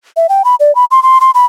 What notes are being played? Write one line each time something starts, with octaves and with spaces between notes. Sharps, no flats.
E5
G5
B5
D5
B5
C6
C6
C6
B5